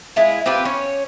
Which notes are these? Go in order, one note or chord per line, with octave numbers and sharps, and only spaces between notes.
G#3 E4 F4
C4 F4 G4 B4
C#4 C#5